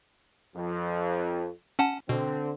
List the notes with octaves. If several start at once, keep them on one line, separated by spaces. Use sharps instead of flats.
F2
C#4 F#5 A5
B2 D3 C4